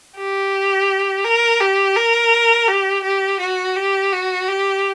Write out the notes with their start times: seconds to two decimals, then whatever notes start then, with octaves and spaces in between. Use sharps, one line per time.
0.17 G4
1.24 A#4
1.60 G4
1.97 A#4
2.68 G4
3.04 G4
3.40 F#4
3.76 G4
4.12 F#4
4.48 G4